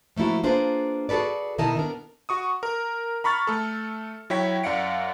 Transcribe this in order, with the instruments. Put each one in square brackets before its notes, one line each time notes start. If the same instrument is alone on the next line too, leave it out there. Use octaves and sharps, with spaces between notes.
[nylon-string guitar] F3 A3 A#3 E4 F#4
A#3 D4 F4 G#4 B4 C5
F#4 G#4 A4 B4 D5
B2 D#3 E4 A#4 D#5 A5
B3 D4 A#4
[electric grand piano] F#4 C#6 D#6
A#4
A#5 B5 C#6 F6 A6
A3 A4
F#3 E4 C#5 G5 B6
F#2 D5 F5 F#5 C#7 D7